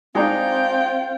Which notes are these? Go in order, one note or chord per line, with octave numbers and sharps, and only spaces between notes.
G#3 C4 D4 D#4 F4 G5